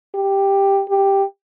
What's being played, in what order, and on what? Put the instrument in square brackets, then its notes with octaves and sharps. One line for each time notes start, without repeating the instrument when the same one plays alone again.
[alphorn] G4
G4